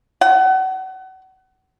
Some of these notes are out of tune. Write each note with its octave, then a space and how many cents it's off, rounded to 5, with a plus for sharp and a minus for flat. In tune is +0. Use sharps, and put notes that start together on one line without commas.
F#5 +35